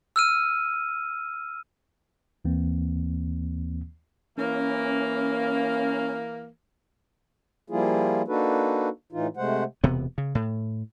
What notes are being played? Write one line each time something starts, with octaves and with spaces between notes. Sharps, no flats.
E6 F6 D#7
D#2 E3 A#3 C4
E3 A#3 C#4
F3 G3 A#3 E4 F4 G#4
A#3 D4 D#4 F#4 A4 B4
A2 E3 D#4 F4
C3 G#3 A3 C5 F#5
E1 C3 B3
C#3
A2